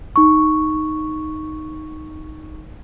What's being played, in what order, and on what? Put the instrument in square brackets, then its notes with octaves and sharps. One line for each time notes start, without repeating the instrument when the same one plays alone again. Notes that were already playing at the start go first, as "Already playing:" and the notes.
[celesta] D#4 C#6